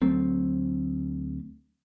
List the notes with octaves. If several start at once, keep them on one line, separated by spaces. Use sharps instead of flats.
D2 F#3 A3 C4